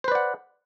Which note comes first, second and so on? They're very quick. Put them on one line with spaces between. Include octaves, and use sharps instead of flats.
C5 B4 D5 F#5